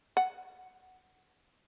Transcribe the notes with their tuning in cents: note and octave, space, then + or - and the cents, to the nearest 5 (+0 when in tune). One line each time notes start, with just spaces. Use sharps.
F#5 +5